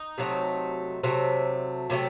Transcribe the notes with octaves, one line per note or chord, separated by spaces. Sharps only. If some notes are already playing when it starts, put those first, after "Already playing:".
Already playing: D#4
C3 F#3 A3
C3 F#3 A3
C3 F#3 A3 G4